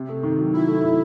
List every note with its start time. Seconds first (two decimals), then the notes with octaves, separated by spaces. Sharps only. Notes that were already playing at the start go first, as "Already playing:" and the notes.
Already playing: C3
0.09 A3
0.23 D#3
0.38 F#3
0.53 C3 E4
0.68 A3
0.83 D#3